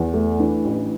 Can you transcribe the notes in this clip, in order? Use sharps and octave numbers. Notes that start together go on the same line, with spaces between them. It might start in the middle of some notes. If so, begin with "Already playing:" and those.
Already playing: E2
A3
E3 D4
A1